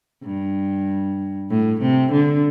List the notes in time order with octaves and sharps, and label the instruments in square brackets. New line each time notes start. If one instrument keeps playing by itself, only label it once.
[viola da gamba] G2
A2
C3
D3